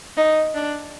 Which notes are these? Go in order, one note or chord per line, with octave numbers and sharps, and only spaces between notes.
D#4
D4